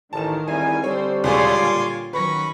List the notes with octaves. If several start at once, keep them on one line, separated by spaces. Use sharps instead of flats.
A1 D#3 A#4 A5 E7
E2 G3 C4 E4 G#5
D3 G3 C4 C5 C#5
E2 B2 G#3 F4 C#5 G#5 C6 D6
A#2
D#3 F#3 C#4 B4 B5 C#6 A#6